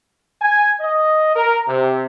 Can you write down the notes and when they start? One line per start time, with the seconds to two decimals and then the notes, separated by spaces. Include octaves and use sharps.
0.41 G#5
0.81 D#5
1.36 A#4
1.68 C3